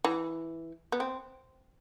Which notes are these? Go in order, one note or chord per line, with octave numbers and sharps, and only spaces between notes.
E3
B3
C4